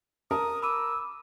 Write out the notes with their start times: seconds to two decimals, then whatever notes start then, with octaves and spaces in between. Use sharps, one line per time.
0.31 A#4 A5 D#6
0.62 B5 D6 E6 D#7